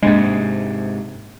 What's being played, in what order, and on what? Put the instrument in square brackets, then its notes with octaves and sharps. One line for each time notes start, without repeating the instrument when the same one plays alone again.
[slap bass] G#2 C3 [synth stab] G#3 [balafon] A#3 D4